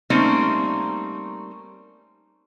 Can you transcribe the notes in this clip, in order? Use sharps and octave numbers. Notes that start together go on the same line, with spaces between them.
G3 A3 A#3 C4 C#4 D#4